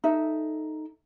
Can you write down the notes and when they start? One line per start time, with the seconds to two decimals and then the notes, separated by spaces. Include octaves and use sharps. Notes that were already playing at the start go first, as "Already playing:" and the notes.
0.04 D#4 A4 E5